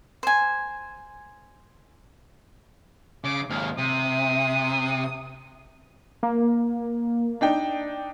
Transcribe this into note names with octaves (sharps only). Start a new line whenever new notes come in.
C5 G#5
C#3 D6
D#2 G#2 F5
C3 D#6
A#3
D4 D#4 G5